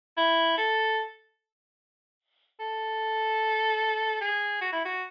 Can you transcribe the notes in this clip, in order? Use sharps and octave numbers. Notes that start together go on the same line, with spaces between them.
E4
A4
A4
G#4
F#4
E4
F#4